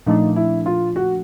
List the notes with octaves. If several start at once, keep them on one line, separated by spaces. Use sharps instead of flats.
A#2 F3 A3 D4 D#4
E4
F4
F#4